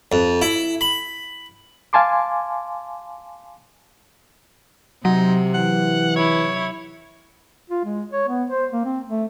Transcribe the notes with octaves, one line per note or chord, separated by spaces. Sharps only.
F2
E4
B5
F5 G#5 A5 C6 D6
C3 F#3 D#4
E3 F#5
E4 C#5
F4
G#3
C#5
B3
C5
A#3
C4
A3